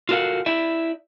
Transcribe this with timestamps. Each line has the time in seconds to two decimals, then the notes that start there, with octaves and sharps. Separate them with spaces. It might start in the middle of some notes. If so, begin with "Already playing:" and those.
0.09 F4 F#4 A4 A#4 F5 F#5
0.46 E4 D5 E5